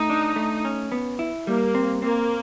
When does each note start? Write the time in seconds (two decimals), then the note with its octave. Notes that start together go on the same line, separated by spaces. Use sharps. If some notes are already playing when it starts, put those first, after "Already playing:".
Already playing: A3 D#4
0.10 D4
0.36 A3
0.65 C#4
0.92 B3
1.19 E4
1.47 G3 A#3
1.75 C4
2.02 A#3 C4